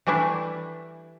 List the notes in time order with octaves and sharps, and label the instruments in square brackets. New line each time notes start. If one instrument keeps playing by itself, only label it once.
[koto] E3 G3 A3 D4 E4